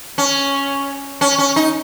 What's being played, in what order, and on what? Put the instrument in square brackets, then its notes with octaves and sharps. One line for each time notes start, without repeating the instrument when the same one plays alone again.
[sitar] C#4
C#4
C#4
D#4